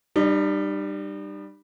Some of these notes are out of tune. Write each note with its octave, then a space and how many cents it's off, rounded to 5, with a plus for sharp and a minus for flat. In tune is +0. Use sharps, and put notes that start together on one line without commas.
G3 +0 D#4 -45